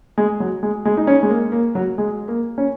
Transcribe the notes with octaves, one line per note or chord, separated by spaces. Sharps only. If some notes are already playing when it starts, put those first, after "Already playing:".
G#3
F#3
G#3
G#3
D#4
C#4
G#3
A#3
A#3
F#3
G#3
A#3
C#4